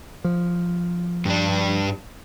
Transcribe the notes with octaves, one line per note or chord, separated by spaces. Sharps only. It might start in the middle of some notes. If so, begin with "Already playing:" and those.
F3
G2 D4